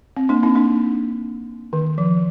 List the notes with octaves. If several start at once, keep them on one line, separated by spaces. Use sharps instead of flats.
C4
A#3 D4
C4 D#4
A#3 D4
D#3
F3